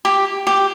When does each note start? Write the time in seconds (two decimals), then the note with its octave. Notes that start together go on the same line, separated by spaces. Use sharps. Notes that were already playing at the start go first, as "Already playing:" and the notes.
0.05 G4
0.47 G4